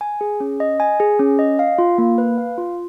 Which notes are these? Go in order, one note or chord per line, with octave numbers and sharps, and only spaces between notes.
G#5
G#4
C#4
D#5
G#5
G#4
C#4
D#5
F5
F4
A#3
B4
F5
F4